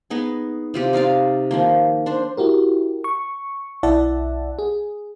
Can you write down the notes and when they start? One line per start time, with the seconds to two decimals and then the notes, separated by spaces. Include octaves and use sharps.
0.10 B3 D#4 G#4
0.74 C3 F4 G4
0.93 D#4 F4 D5 F5
1.51 D#3 F3 A#3
2.06 D4 C5
2.37 E4 F#4 G4 A#4
3.04 C#6
3.83 B1 E4 D5 E5 F#5 A5
4.59 G#4